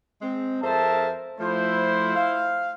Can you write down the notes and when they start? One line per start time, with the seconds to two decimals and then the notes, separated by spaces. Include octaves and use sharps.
0.21 G#3 C4
0.62 F2 G#4 A#4 C5 E5 A5
1.39 F3 A3 E4 C5
2.16 F5